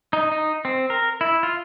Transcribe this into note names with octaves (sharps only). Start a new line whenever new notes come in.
D#4
D#4
C4
A#4
E4
F4